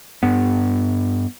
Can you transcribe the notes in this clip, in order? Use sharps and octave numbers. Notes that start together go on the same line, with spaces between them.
G2 B3